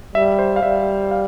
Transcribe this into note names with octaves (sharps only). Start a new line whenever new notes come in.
G3 E5
C5
F5
G3 E5
F5